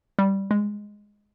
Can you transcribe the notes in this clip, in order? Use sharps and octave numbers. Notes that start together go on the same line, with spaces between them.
G3
G#3